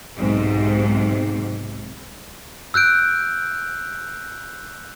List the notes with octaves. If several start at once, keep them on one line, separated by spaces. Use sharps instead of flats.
B1 G#2 C3
E6 F#6 G6 D7